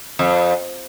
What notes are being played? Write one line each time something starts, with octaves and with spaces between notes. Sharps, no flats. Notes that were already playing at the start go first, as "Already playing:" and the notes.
F2